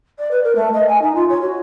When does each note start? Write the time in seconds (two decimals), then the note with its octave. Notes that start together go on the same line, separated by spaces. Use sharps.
0.18 D5
0.31 B4
0.43 A#4
0.55 A3
0.73 D#5
0.88 G#5
1.02 D#4
1.15 F4
1.29 C#5
1.41 F#4